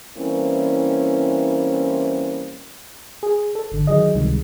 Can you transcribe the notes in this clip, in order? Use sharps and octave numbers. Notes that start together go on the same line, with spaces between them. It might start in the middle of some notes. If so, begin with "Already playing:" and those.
E3 G3 A#3 C4 C#4 E4
G#4
A4
G#1 D3
D#3 F#3 G#4 D#5
C#2 C3 D#3 G3 G#3